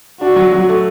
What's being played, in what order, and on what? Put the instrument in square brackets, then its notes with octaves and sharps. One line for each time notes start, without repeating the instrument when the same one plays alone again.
[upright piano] D4 [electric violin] F#4
[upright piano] F#3
F#3
A3